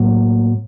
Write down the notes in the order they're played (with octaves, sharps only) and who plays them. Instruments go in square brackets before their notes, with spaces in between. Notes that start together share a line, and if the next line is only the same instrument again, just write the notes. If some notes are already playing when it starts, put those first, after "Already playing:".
Already playing: [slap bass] A2 F#3 A#3